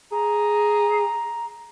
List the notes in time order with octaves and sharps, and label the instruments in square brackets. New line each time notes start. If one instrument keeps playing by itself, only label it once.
[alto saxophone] G#4 [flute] A#5